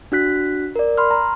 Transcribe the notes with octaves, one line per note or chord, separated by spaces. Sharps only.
D4 F#4 F#6 B6
A#4 D5
B5 C6 F6
A#5